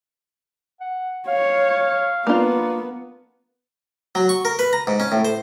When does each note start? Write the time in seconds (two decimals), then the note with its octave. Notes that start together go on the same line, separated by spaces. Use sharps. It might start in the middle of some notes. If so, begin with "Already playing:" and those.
0.81 F#5
1.28 C#5 F5
2.27 A#3 B3 D4 F4
4.15 F#3
4.29 C#6
4.45 A#4
4.59 B4
4.73 A#5
4.87 G#2
5.00 C#4
5.12 A2
5.25 C5